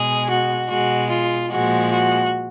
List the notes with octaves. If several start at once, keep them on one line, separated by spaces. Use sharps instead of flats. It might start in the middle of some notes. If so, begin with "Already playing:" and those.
Already playing: B2 G#3 G#4
F#4
B2 G#3 F#4
F4
A#2 F3 G#3 F#4
F#4